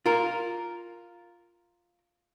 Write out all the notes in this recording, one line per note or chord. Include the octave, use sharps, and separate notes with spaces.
F4 A#4